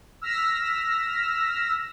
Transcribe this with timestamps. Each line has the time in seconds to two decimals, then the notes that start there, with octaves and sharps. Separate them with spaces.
0.22 E6 F6 A#6 B6